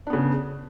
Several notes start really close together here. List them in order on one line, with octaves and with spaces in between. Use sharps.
D4 B3 C#3